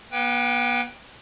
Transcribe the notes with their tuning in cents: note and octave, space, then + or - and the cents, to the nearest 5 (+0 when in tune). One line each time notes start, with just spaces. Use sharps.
B3 -45 B4 +0 G5 +0